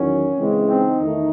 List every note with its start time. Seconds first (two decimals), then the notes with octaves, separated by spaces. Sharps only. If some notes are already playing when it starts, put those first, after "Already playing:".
Already playing: E2 D#3 F#3 C#4
0.37 C#3 E3 G#3 C4
0.68 C4 D#4
0.99 E2 D#3 A3